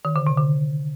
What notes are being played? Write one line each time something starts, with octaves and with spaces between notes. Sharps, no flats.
D#3
D3
C3
D3